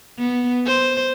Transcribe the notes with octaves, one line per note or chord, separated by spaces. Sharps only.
B3
C5